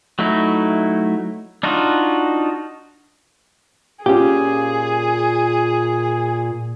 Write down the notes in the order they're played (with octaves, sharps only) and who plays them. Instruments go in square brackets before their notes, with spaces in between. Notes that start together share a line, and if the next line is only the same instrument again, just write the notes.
[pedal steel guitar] F#3 A3 D#4 E4
D4 D#4 F4 F#4
[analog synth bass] A#2 [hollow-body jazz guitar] C#4 F4 G4 [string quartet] G#4